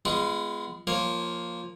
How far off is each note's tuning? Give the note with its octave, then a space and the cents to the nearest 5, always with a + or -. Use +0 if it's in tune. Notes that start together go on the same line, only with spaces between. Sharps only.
G#3 +0 B3 +15 F4 -30
F3 +0 A#3 +0 C#5 -25